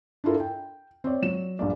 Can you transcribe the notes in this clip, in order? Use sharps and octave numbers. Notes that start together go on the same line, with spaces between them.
D4 E4 F4 A4 A#4
G5
C4 C#5 D5
F#3 E7
A#1 G2 D5